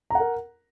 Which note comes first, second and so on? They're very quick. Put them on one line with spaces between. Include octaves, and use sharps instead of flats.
A#5 F#5 A#4